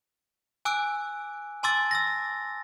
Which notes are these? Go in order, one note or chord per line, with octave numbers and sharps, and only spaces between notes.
G#5 D6 E6 F#6 D7
G#5 A5 C6 D6 E6 A6
E6 A6 A#6